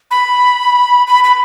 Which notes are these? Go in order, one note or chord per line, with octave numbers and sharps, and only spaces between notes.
B5
B5
B5